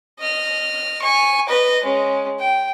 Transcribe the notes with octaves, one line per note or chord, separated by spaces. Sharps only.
D#5 F6
G#5 C#6
B4 D#5
G#3 C#4
G5